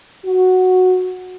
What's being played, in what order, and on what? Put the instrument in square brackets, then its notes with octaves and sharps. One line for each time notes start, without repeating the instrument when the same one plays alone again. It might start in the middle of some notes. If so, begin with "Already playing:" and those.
[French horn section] F#4